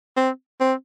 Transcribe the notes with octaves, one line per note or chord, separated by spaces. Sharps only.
C4
C4